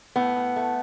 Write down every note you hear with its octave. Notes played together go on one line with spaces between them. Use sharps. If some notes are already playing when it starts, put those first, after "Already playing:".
A2 B3
A2
A3